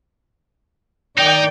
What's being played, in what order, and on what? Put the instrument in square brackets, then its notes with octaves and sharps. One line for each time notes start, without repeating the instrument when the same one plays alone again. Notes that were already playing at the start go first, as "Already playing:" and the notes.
[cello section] D#3 D5 [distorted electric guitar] D#4 [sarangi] G5